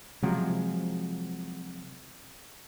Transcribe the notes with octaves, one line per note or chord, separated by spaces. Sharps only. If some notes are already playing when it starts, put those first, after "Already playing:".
C3 F3 F#3 G#3